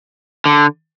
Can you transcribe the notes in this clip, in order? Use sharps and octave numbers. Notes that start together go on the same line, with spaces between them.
D3